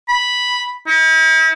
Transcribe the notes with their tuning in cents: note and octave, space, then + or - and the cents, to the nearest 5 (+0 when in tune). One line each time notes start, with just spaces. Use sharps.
B5 -5
E4 -45